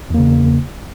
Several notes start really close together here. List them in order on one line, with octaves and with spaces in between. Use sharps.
E2 A#3 C#3